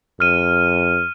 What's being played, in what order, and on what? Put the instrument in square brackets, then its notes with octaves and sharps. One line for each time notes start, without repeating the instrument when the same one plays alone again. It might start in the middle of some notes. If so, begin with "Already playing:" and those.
[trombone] F2 [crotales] F6 D#7